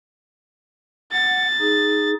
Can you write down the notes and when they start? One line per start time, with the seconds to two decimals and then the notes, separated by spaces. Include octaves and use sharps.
1.13 F#5 A6
1.60 D#4 G#4